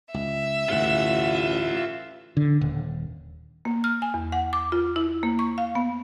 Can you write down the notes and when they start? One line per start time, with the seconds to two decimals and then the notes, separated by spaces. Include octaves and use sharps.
0.14 C#2 E5
0.69 A1 D2 G2 C3 F4 F#5
2.37 D3
2.61 D#1
3.65 A#3
3.84 F6
4.02 G#5
4.14 E2
4.32 F#5
4.53 D6
4.72 F4
4.96 E4
5.23 A#3
5.39 C#6
5.58 F5
5.75 B3